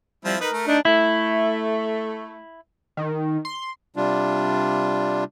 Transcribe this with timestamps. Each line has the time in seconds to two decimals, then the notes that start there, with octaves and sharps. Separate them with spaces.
0.25 F3 G3 C4 E4
0.41 D#4 A#4 B4
0.52 A3
0.67 D4 D#4
0.85 A3 E4
2.97 D#3
3.45 C6
3.96 C3 G3 D4 F4